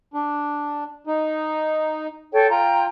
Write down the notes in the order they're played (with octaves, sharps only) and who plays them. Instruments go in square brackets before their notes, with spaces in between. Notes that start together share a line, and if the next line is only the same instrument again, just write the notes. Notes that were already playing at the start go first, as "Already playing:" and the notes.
[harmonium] D4
D#4
[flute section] A4 C#5 G5
[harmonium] F4 [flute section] G5 A#5